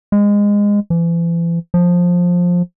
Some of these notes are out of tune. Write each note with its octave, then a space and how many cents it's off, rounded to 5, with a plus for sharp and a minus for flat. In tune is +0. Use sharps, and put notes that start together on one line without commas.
G#3 -20
E3 +40
F3 +15